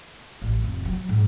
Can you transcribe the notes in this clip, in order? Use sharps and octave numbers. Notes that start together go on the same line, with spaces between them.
A1
F1
F#3
G#2